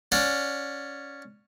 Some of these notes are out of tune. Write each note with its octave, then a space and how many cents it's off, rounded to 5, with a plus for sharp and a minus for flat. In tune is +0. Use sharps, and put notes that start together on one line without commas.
C#4 +0 D5 +5 F#5 -30